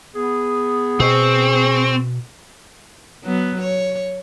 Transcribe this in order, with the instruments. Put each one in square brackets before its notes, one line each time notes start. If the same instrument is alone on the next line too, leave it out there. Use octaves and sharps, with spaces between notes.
[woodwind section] B3 G#4
[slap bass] B2 [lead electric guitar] C4 [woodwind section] G#4 C#6
[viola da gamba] F#3 B3
C#5